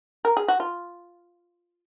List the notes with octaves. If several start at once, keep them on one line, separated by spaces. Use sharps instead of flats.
A#4
G#4
F#4
F4